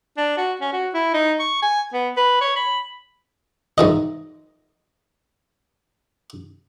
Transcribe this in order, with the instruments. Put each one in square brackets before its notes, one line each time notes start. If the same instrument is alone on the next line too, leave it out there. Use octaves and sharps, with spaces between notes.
[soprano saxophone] D4
F#4
C#4
F#4
E4
D#4
C#6
G#5
B3
B4
C#5
B5
[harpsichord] G#2 E3 D#5